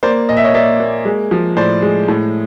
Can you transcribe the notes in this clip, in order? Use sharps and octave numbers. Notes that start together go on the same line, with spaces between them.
A#3 C5 D5
A#1 D#5
E5
C#5 D#5
A#3 D5 E5
A#3
G#3
F3
A2 C5 D5
G#3
A2